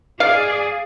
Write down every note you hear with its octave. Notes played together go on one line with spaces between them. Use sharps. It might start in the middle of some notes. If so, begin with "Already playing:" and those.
G#4 D5 F5